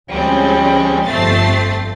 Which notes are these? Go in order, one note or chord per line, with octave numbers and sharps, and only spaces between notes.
D2 F3 G3 G#3 C4 C#4
G1 F2 A3 C4 A6 C7